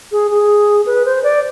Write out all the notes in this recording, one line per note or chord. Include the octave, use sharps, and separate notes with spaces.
G#4
G#4
B4
C5
D5